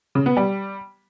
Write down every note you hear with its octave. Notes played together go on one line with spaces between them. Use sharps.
C#3
B3
G3